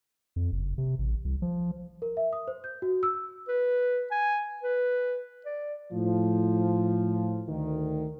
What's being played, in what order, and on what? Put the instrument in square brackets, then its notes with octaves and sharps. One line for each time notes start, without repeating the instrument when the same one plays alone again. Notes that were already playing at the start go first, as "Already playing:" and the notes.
[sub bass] F2
F#1
C3
A1
C2
F3
[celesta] A#4
E5
D#6
C5
G6
F#4
E6
[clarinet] B4
G#5
B4
D5
[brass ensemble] A2 F3
D2 D#3